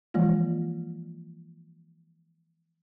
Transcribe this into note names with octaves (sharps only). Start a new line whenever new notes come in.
E3 F3 G#3 A#3 F4